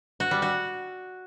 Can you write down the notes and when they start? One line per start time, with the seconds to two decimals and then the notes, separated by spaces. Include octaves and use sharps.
0.20 F#4
0.31 G3
0.42 F#4